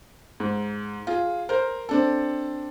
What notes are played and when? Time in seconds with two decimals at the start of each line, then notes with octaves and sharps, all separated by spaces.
0.40 G#2
1.07 F4 G#4
1.49 A#4 C5
1.89 C4 D4 A4